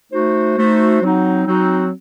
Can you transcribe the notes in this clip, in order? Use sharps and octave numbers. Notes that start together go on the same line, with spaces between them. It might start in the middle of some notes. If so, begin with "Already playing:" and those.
A3 D#4 F#4 C5
A3 D#4 F#4 C5
F#3 C4 D#4 F#4
F#3 C4 D#4 F#4